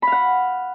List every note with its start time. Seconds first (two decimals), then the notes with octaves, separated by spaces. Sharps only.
0.02 B5
0.07 F5
0.12 F#5